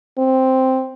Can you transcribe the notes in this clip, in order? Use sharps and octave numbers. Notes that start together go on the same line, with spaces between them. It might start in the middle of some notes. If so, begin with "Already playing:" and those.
C4